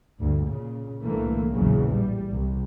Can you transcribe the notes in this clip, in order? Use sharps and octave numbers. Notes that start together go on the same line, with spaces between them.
D2 G2
A#2 C#3
C2 A2 D3 E3 A3 A#3
A#1 E2 C#3 E3 F#3
A2 G3
C2